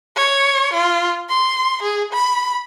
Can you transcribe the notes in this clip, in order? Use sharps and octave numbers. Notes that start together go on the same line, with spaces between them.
C#5
F4
C6
G#4
B5